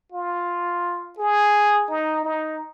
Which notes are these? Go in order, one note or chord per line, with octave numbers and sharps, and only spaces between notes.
F4
G#4
D#4
D#4